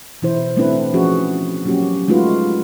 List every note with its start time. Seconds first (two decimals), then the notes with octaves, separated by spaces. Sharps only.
0.22 B2 E3 E4 C5
0.57 A3 B3 C4 D4 E4 B4
0.93 F3 B3 C#4 F#4 G#4
1.65 F#3 A#3 C#4 F#4 G4
2.08 G#3 A3 D#4 F4 F#4 B4